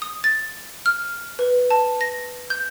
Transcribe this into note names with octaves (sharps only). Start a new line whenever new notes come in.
D#6
A6
F6
B4
A5
A#6
G6